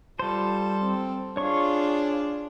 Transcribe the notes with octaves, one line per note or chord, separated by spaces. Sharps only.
G3 F4 A4 C5
C4
D4 F4 G#4 C#5 C#6